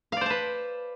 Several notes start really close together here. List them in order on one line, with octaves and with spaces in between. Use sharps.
F5 D5 C5 A5 B4